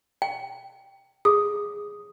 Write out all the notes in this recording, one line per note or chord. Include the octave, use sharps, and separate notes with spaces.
G5
G#4 D#6